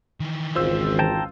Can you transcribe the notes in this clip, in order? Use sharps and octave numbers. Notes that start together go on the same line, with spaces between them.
D#3 E3
G#1 C#2 F4 C5 E6
G5 A5 A#5